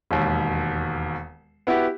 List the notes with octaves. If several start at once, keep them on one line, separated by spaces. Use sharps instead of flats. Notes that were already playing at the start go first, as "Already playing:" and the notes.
E1 D#2
B3 E4 F#4 G4